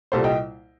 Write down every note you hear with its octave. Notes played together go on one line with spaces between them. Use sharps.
C2 A#2 G3 A4 C5
D#5 G5